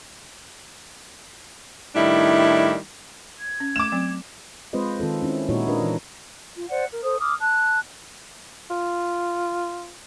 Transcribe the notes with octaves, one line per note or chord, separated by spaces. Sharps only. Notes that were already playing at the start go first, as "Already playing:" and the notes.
A2 D#3 G3 D4 E4
G#6
C#4
A3 D6 E7
F#3 C4
G#3 C4 F4 B4 C5 D#5
D#3 C4 F4 A4
C4 C#4 E4
A#2 G#3 D#4 E4 F#4 C#5
D4 D#4 F4 A#4 B4 D#5
E3
F4
C5 D5 F#5
A#4
A4 C5 D#6
D6 D#6 F6
A5 F#6
F4